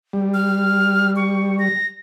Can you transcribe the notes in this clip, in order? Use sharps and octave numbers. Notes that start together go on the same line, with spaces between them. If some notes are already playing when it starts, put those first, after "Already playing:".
G3
F6
C#6
A#6